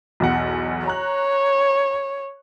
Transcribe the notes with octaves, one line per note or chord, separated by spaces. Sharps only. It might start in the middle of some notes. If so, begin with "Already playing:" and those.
B1 E2 F#5
C#5 A#5 F#6